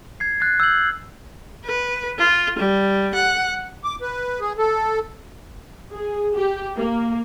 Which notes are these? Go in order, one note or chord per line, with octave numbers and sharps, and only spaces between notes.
G#6 C7
F#6 A6 C7
E6 G6 G#6 F#7
B4
F4
G3
F#5
D6
B4
G#4
A4
G#4
G4
A#3